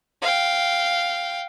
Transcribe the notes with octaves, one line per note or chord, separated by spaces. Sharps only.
F5 G5